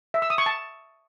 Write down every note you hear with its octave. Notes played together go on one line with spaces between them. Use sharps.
E5
E6
D#6
C#6
A5